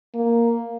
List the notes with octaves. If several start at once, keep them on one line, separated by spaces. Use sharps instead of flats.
A#3